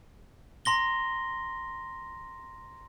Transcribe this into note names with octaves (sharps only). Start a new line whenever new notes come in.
A#5 C6 A#6 G7